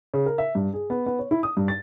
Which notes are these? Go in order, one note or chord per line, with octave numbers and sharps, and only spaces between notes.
C#3
A#4
E5
G2
G#4
B3
B3
C#5
E4
D#6
G2
A6